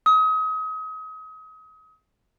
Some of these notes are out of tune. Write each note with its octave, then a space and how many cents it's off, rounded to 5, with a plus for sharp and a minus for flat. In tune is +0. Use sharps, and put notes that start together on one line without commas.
D#6 +35